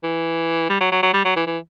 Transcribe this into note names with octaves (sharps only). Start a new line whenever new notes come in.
E3
G3
F#3
F#3
F#3
G3
F#3
E3
E3